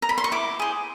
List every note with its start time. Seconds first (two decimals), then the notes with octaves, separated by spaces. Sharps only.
0.02 A#5
0.09 B5
0.18 C6
0.24 C#6
0.32 E4 D6
0.59 G#4 C5